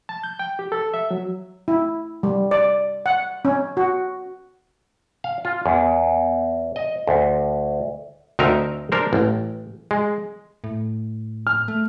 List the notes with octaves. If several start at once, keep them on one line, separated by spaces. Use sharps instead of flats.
A5
G6
G5
G4
A4
E5
F#3
E4
G3
D5
F#5
C#4
F#4
F5
F4
E2
D#5
D2
D2 C4 D#4 A#4 E5
D4 A#4 C5
A1
G#3
A2
F6
A3